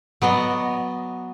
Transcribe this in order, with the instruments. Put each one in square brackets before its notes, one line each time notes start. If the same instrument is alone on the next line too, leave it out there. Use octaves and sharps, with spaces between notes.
[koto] F#3 B3 D5 D#5